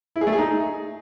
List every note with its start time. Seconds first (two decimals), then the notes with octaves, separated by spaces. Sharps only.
0.16 E4
0.21 G#4
0.27 A3
0.32 G#4
0.38 D#4